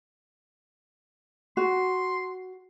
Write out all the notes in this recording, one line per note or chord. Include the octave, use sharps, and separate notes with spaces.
F#4 C6